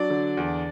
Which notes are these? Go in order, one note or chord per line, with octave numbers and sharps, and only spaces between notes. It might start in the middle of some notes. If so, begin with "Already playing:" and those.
Already playing: F#3 D4 D5
D3
E2